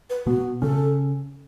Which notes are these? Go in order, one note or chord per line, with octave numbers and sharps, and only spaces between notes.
B4
B2 B3 F#4
C#3 C#4 A4